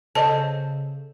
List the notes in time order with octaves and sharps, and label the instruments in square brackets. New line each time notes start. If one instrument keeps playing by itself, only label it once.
[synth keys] C#3 [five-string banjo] A4 C5 D#5 [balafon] A5